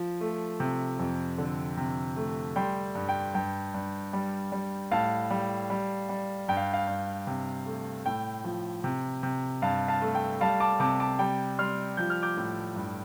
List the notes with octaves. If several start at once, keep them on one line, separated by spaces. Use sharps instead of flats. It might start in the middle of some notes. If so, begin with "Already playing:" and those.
Already playing: F3
A3
C3
F2
D3
C3
A3
G3 G5 C6
G2
G5
G2 G5
G2
G3
G3
A2 F5 A5
G3
G3
G3
G2 G5
F5
F5
G2
C3
A3
A2 G5
F3
C3
C3
G2 F5 A5
F5 A5
A3
G5
G3 F5 A5
A5 D6
C3 A5 D6
A5 D6
G3 G5
G3 C6 F6
F3 G6
F6
D6 G6
A2
G2